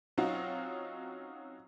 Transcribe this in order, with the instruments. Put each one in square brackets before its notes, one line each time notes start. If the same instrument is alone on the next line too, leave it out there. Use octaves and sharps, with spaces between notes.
[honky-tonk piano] F#3 C4 C#4 D#4 F4 F#4